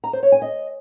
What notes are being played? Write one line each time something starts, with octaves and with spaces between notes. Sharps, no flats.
A#5
C5
C#5
G#5
D#5